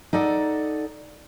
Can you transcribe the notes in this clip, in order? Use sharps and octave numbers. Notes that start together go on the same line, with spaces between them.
D#4 A4 D5 F#5